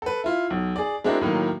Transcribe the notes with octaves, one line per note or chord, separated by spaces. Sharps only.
A4 B4
E4 F4
B1
G#4 D5
G#3 C4 D4 E4 F#4 A#4
A2 D#3 F#3 A#3